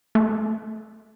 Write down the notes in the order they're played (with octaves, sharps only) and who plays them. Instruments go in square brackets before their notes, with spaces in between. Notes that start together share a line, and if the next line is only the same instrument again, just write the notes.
[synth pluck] A3